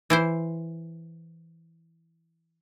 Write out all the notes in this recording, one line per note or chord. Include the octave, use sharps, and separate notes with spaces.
E3 E4 C5